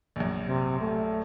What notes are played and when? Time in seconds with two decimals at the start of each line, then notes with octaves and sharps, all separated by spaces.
0.16 A#1 F#2
0.47 C3
0.81 A3